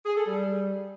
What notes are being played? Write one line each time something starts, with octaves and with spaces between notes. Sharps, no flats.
G#4
A4
G3